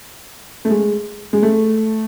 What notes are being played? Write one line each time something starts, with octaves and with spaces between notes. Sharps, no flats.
A3
G#3
G#3
A3